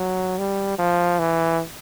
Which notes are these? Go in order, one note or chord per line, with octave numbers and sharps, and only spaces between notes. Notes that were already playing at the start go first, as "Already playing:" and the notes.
Already playing: F#3
G3
F3
E3